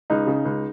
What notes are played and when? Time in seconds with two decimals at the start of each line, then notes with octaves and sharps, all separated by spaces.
0.10 C#2 D#4
0.27 C#3
0.45 C#2